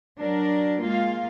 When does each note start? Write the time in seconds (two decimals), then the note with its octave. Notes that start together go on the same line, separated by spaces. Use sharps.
0.19 F#3 D4 A#4
0.81 G#3 A#3 F4 F5